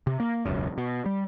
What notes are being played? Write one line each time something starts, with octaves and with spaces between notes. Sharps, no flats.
C3
A#3
E1 C#2 F#2
B2
G3